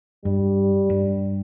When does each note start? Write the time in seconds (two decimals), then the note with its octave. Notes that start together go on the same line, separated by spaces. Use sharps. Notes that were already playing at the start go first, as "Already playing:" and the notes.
0.25 G2 G3
0.90 G2